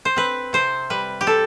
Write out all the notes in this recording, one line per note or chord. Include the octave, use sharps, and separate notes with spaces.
C5
C4 B4
C3 C5
G3 B4
G4
C3 A4